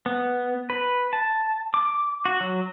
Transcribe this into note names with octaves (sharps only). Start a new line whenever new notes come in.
B3
B4
A5
D6
F#4
F#3